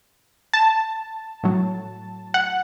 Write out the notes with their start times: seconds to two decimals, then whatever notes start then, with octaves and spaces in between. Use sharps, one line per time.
0.54 A5
1.44 A2 F#3
2.34 F#5